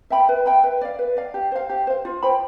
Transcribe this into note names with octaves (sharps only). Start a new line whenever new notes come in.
E5 G5 B5
B4
E5 G5 B5
B4
D5 F5
B4
D5 F5
G4
C5 F5
G4
C5 F5
F4
C5 G5 B5